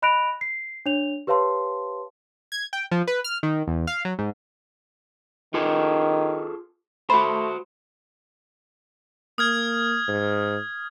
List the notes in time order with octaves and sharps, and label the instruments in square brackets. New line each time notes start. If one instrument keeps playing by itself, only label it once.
[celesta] D#5 B5 F#6 A#6 D7 F7
C7
D4 C#5 F7
G4 B4 C#5 F5 A5 C6
[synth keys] G#6
G5
F3
B4
F6
D#3
E2
F5
F#3
G#2
[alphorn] D#3 [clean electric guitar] F4 G#4 A4
[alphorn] A3 [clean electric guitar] F#4 C5 [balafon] B5
[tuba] A#3 [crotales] D#6 F6 G#6
[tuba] G#2